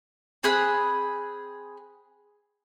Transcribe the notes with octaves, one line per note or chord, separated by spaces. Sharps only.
C4 G#4 B5 F#6